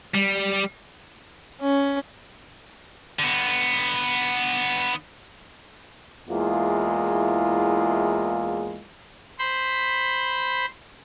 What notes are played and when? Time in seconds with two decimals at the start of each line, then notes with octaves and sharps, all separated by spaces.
0.14 G3
1.61 C#4
3.19 D3 B3
6.29 E2 G#3 A#3 E4 F4
9.39 C5 B5 C6